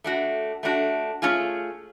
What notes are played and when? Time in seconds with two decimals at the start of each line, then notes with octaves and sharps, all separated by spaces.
0.04 A3 D4 F#4
0.63 A3 D4 F#4
1.22 A3 C#4 F4 G#4